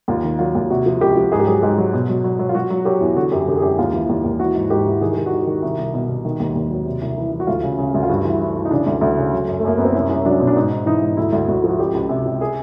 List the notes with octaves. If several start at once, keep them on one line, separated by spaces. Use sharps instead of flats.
D#2 F4
D#3
F#3 F4
D#2
C3 F#4
F3
C#2 G4
F3
G#2 G#4
G4
F#3 G#4
G#2 G4
F#3
B2
F#3
F#3
F#3
F4
F#3 F#4
F#3
F#3 G4
E2
D3 F#4
F#2 G4
D3 G4
G#4
F#2 G4
D#2 F4
E3
D#2
D#2
E3 F#4
G#2
G#2 G4
E3
D#3 G#4
D#3 G4
F#4
D#3
G4
D#3
C2
C2
B2
B2
D#3
D#2
D#2
F#3
C3
C2
E3
E3
F#4
D2 F4
C#3
C#3
D2
F4
G2 F#4
E3
E3
E3
D#4
C#3 D4
D2
D2
C#3
F#3
F#2
A3
F#2 A#3
F#2 B3
C4
C2 C#4
C2
C#4
F#3 D4
B2
D4
G#2 D#4
G#2
E3 D#4
G#2
D2 E4
D2
D2 F#4
F3 F#4
C#2 G4
C#2
C3
C#2
G#4